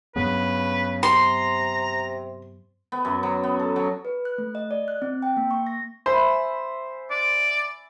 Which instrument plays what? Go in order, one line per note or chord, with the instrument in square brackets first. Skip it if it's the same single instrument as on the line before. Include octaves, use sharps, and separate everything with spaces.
[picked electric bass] G2 F#3 B3 [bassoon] C#3 [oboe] B4
[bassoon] C3 [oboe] A#5 [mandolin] C6
[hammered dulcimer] B3
F#2
F#3
B3
A4
F#3
[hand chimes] B4
F#6
A3
D#5
D5
F#6
C4
G5
A#3
C#6
A#6
[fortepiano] C5 [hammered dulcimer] E5 G#5 B5
[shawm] D5